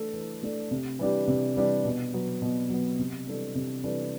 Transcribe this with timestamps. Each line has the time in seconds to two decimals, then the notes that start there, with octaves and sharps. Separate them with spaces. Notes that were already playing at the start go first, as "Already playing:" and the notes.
Already playing: E3 A3 D4 A4
0.13 E3
0.43 A3 D4 A4
0.71 C3
0.99 E3 G3 D4 G4
1.27 C3
1.56 E3 G3 D4 G4
1.85 B2
2.14 F#3 B3
2.42 B2
2.70 F#3 B3
2.99 C3
3.27 E3 G3 D4 A4
3.55 C3
3.83 E3 G3 D4 A4